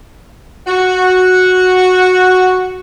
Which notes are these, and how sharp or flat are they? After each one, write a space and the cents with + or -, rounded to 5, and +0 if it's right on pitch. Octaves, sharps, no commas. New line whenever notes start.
F#4 -5